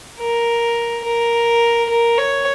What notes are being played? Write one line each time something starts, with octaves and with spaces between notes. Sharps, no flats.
A#4
A#4
A#4
C#5